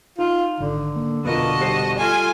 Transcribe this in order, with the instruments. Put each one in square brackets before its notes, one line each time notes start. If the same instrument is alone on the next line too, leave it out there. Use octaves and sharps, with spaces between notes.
[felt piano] D#4 [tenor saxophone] F4
[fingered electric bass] G#1 [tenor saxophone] D3
[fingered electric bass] A#3
[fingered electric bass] F1 B2 [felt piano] B3 F4 A#4 [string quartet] F#4 D#5 A5
[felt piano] G3 C5 C7
[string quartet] F4 A4 G#5